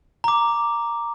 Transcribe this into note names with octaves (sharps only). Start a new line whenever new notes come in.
A#5 D6